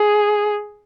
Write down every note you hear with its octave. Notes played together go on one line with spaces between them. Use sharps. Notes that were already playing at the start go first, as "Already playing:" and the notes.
Already playing: G#4